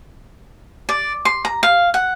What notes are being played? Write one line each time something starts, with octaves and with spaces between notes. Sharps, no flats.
D5
C6
A#5
F5
F#5